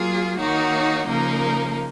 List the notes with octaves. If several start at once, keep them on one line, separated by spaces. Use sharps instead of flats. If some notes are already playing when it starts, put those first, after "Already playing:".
Already playing: F#3 A#3 F4 G#4
D#3 A#3 D#4 F#4 C#5
C#3 F3 A#3 D#4 A#4